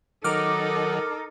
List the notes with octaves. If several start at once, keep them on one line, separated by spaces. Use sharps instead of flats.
D#3 F#3 D#4 A4 A#4 D6 F6